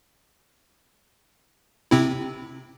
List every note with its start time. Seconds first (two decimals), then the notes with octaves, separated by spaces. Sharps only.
1.91 C3 C4 E4